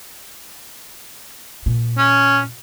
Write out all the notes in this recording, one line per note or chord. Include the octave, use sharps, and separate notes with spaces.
A#2
C#4